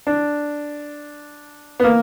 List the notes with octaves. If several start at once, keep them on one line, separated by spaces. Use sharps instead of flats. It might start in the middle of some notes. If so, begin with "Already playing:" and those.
D4
B3
A#3